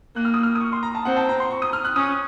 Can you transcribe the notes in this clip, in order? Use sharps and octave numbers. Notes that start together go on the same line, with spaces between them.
A#3 F#6
F6
D#6
F6
D#6
C#6
C6
A#5
A5
C4 F#5
A5
A#5
C6
C#6
D#6
F6
F#6
C#4 D#6